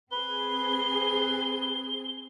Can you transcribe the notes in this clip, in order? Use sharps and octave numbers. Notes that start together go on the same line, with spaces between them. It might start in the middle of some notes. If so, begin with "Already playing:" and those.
C4 G#4 B4 G7